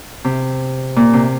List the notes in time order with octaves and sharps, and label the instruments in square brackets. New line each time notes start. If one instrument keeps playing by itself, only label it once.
[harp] C3
A#2
C3